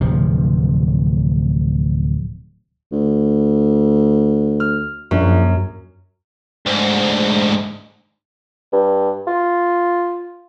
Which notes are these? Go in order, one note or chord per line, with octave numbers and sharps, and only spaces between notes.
D1 C3 F3
D2
F6
A#1 F#2
D2 G#2
G2
F4